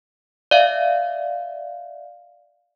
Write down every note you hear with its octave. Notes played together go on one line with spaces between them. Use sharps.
D5 E5 F5